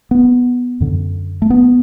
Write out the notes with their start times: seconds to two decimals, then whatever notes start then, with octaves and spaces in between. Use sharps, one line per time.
0.11 B3
0.80 F#2 D3
1.42 A3
1.50 B3